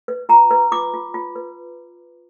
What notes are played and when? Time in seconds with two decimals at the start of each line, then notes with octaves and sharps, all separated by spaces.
0.08 B4
0.29 F4 A#5
0.51 B4
0.72 F4 D6
0.94 F4
1.14 F4
1.36 B4